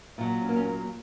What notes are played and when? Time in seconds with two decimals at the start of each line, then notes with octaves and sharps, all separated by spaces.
0.18 A#2 F#3
0.42 C#4
0.49 A#3
0.56 C#4
0.65 A#3